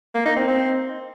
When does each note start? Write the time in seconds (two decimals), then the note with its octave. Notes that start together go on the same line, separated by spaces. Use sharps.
0.14 A#3
0.25 D#4
0.36 C4
0.47 C4